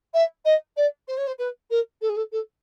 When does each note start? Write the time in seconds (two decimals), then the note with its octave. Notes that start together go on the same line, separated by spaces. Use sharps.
0.14 E5
0.45 D#5
0.76 D5
1.08 C5
1.17 C#5
1.27 C5
1.38 B4
1.70 A#4
2.01 A4
2.09 G#4
2.16 A4
2.32 A4